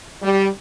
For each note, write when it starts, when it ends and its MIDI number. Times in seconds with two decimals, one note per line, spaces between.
0.22 0.47 55